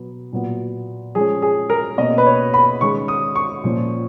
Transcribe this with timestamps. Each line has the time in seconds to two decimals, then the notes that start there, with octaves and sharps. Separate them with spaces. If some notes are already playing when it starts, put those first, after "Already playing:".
Already playing: B2 F#3 B3
0.32 A#2 F#3 B3
1.15 F3 G#3 C#4 G#4
1.42 G#4
1.70 A#4
1.98 B2 A#3 C#4 D#5
2.18 B4
2.26 C#5
2.54 B5
2.81 D#3 G#3 C#4 C#6
3.08 D#6
3.36 C#6
3.64 A#2 F3 A#3 C#4